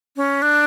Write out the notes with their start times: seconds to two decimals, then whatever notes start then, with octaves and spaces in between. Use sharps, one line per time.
0.16 C#4
0.42 D4